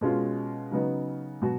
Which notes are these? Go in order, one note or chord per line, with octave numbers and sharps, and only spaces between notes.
B2 G#3 C#4 F4
C#3 F#3 B3 D#4
B2 F#3 B3 F#4